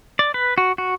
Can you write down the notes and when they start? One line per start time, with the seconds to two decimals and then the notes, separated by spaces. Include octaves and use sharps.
0.19 D5
0.34 B4
0.58 F#4
0.78 F#4